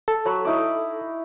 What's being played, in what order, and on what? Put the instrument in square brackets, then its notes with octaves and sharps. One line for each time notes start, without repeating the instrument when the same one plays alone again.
[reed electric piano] A4
[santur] F#3 C#5 B5
D#4 E4 D6